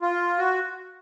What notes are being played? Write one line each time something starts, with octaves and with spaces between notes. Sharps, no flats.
F4
F#4